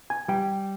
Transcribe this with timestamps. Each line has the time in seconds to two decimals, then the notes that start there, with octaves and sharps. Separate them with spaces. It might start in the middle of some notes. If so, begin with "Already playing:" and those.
0.10 G#5
0.28 G3 G5